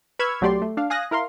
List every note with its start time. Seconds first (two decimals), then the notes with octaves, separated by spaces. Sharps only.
0.19 B4 B5 C#6 E6 F6 G#6
0.41 B1 F#3 A3 G4 D5 C6
0.62 A3
0.77 D4 F5
0.90 F5 G#5 D#6 F#6 A#6
1.11 E4 A#4 F5 C6